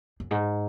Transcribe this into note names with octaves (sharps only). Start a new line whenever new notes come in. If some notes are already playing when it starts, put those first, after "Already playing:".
F#2
G#2